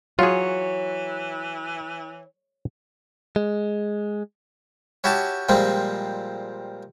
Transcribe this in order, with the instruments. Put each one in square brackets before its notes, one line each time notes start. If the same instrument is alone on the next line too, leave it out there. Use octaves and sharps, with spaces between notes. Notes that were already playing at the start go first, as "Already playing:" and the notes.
[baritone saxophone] E3 [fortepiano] F#3 [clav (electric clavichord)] F4 G#4 [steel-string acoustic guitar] C#5
[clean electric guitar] G#3
[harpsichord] C#4 E4 F#4 G4 A5
A#2 F3 G3 G#3 C4